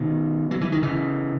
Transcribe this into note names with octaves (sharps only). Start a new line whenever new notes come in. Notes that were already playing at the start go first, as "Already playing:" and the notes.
Already playing: B2 D#3
F#3
E3
D#3
C#3 E3